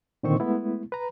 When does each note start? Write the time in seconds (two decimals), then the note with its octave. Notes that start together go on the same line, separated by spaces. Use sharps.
0.23 A#2 D3 D#3 C4 C5 C#6
0.40 G#3 A3 B3 E4
0.92 B4 A#5